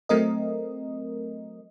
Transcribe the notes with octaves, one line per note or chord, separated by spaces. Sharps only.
F#3 A3 C4 A#4 D#5